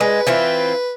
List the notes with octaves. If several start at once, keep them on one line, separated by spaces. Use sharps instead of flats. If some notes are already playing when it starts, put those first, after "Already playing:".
G#3 B4
E3 C4 F4